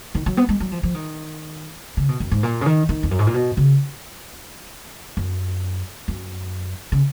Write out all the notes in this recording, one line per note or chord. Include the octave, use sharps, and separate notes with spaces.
D#3
F#3
B3
G#3
F#3
F3
F3
D#3
C#3
B2
F#2
G#2
A#2
C#3
D#3
D#3
F2
F#2
G#2
A#2
B2
C#3
F#2
F#2
C#3